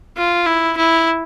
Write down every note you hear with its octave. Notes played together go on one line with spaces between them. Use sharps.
F4
E4
E4